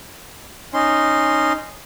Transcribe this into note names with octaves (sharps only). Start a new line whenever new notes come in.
C#4 D#4 C6